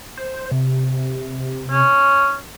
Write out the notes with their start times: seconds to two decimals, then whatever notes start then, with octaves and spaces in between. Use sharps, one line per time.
0.17 C5
0.51 C3
1.71 C#4